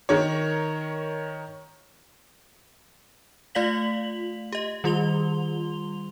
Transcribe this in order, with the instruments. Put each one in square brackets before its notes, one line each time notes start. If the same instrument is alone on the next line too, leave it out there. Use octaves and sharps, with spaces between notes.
[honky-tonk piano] D#3 A#4 C#5
[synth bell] A3 F4 D5 F5 B6 F#7
G4 D#5
D#3 G3 F4 C6 F7 G7